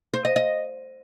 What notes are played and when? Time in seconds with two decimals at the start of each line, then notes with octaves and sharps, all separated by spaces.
0.14 C5
0.25 D#5
0.36 D#5